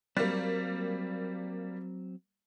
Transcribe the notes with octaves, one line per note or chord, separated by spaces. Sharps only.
F#3 G3 A#3 C4